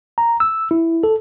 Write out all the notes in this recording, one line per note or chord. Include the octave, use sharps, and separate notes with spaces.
A#5
E6
E4
A4